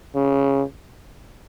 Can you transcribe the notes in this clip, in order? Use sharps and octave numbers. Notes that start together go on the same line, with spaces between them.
C#3